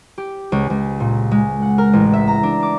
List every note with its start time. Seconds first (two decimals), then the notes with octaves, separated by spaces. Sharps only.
0.18 G4
0.52 C#2
0.70 C#2
1.00 A#2
1.32 G#3
1.62 F#5
1.78 A#4
1.93 A1
2.13 E5
2.28 A#5
2.43 D4
2.63 D6